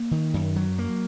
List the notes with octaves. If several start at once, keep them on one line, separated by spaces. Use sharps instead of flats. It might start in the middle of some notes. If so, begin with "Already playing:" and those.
Already playing: A#3
D#3
F#2
F#3
A#3